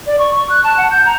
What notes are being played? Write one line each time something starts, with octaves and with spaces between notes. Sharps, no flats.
D5
C#6
C#6
F#6
A5
F#5
G6
A#5